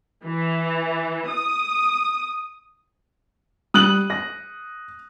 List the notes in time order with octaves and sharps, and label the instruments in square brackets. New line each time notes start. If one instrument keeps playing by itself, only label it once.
[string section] E3
D#6
[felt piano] G3 [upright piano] D#6 F#6 F#7
[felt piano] A#6